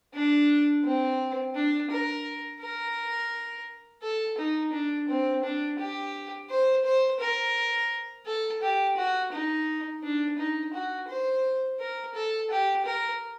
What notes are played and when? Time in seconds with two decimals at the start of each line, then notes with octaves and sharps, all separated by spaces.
0.14 D4
0.84 C4
1.55 D4
1.91 A#4
2.61 A#4
4.03 A4
4.38 D#4
4.73 D4
5.08 C4
5.44 D4
5.80 G4
6.50 C5
6.85 C5
7.20 A#4
8.26 A4
8.62 G4
8.97 F#4
9.32 D#4
10.03 D4
10.39 D#4
10.74 F#4
11.09 C5
11.79 A#4
12.15 A4
12.51 G4
12.85 A#4